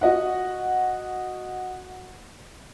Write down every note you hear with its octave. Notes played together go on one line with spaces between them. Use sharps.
F#4 D#5 F#5